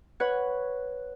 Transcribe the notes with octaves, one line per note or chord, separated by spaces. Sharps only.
B4 C#5 F#5